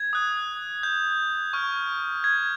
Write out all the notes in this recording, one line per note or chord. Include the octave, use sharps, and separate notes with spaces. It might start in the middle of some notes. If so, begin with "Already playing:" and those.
Already playing: G#6
D#6 F#6
G6
C#6 F6
G#6